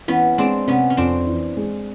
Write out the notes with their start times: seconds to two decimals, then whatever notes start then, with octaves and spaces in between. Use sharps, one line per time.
0.08 E3 B3 C#4
0.38 G#3 C4 D4
0.67 C3 B3 C#4
0.90 C#4
0.97 F2 C4 D4
1.27 E3
1.57 G#3